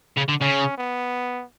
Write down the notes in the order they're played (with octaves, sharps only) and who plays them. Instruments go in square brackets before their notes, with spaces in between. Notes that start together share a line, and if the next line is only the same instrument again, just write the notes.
[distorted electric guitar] C#3
D3
[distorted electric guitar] C#3 [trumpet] C#4
[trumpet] B3